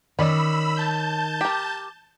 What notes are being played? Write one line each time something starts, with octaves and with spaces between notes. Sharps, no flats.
D#3 C#4 D5 D#5 B5 E6
A5 G6
G4 A#4